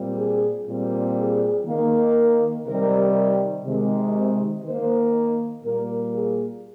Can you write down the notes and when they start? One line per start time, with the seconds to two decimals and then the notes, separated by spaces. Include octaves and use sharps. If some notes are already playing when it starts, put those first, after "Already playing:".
Already playing: A#2 G3 C4
0.18 G#4
0.67 A#2 G3 C4
1.17 G#4
1.66 D#3 A#3
2.66 C3 D#3 G3 A#4
3.65 C3 D#3 G#3
4.64 D#3 A#3 C5
5.64 A#2 G3 A#3 A#4
6.14 G#4